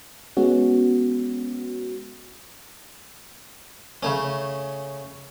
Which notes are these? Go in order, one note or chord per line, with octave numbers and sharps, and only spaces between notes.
G#3 B3 C#4 F#4
C#3 A3 C#4